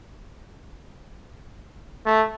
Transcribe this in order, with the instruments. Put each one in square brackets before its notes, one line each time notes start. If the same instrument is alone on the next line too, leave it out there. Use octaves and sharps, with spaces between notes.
[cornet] A3